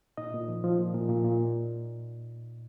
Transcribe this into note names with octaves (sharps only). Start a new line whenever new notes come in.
A#2 D#4 D#5
A#2
F3
F3
A#2
A#2
A#2
A#2